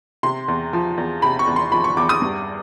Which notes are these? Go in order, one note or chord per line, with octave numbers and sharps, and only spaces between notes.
C3 C6
E2
F3
E2
C3 B5
C#6
E2
C6
F3 B5
C#6
E2 D6
D#6
G2